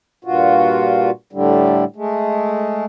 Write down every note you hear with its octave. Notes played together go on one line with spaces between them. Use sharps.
G2 A#2 F4 F#4
A2 D3 G3
G#3 A3